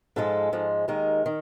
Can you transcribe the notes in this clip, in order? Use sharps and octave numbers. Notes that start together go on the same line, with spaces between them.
G#2 F3 G#3 A4
G#2 F3 G#3
D#2 D#3 G#3 A#4
D#3